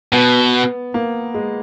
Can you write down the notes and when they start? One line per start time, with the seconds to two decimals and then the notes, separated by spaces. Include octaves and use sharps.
0.13 B2 B3
0.94 A#3
1.34 G#3